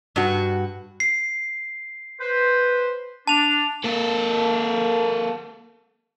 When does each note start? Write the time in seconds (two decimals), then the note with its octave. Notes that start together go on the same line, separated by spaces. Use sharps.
0.16 G2 F#4
1.00 C7
2.20 B4 C5
3.27 D4 A5 F7
3.84 A#3 A4